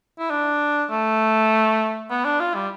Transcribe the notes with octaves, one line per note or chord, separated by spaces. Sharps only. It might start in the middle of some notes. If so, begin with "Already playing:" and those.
E4
D4
A3
B3
D4
F4
G3